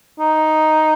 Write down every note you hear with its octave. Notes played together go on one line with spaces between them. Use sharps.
D#4